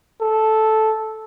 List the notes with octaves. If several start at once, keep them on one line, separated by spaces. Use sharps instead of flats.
A4